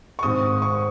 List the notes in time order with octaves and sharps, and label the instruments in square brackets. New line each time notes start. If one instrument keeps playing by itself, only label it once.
[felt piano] C#6
G#1 G#2 G#3 D#6
C#6